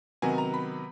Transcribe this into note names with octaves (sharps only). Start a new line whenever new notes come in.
C3 D#3 F#3 B3 G#5
A#5
B5